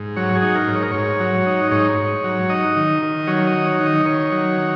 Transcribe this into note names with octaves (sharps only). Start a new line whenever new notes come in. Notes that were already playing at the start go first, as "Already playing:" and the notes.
Already playing: G#2
F#3 C#5
G#4
D#4
A#4
G#2
C#5
A#4
G#2 C#5
F#3
D#4
G#2 C#5
G#2
F#3
D#4 D#5
D#3
D#3
F#3 C#5
D#5
D#4
C#5
D#3
D#5
D#3 C#5
F#3
D#4